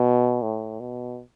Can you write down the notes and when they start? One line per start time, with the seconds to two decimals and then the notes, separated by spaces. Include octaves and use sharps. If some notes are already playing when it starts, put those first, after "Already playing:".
Already playing: B2
0.42 A2
0.80 B2